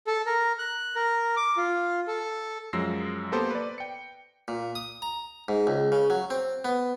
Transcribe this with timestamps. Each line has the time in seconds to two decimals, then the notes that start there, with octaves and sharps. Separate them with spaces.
0.07 A4
0.26 A#4
0.59 F#6
0.95 A#4
1.37 D6
1.57 F4
2.08 A4
2.73 F#2 F3 G#3 E6 A#6 C7
3.32 A#3 B3 G4 A4 C5
3.50 B4 D5
3.78 G5 C#7
4.48 A#2
4.75 D#6
5.02 A#5
5.48 G#2
5.67 C#2
5.92 C#3
6.10 F#3
6.30 C4
6.65 B3